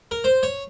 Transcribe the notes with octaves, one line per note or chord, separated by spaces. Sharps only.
A#4
C5
C#5